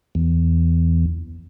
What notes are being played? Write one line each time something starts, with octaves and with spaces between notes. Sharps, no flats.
E2